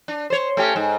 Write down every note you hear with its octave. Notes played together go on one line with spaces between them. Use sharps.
D4
C5 C#5
A3 C#4 G4
G#2